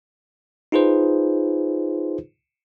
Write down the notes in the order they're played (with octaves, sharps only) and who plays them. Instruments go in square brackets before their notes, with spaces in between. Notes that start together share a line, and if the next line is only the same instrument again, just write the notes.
[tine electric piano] D#4 F4 G#4 B4 C5